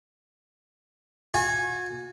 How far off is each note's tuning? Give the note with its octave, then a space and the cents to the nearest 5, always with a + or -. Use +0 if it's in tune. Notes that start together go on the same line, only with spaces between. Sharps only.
F#4 -40 G#5 +0